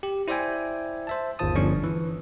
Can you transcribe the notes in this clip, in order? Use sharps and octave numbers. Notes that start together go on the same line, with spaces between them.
G4
E4 C5 D5 E5 G5 G#5
C5 E5 A5
G1 D#2 F4 C5 A5 D#6
G1 F3 C#4 D4 C#6
E3